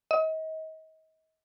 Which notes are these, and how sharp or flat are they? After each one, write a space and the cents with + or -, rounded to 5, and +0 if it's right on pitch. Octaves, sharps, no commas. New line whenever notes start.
D#5 +35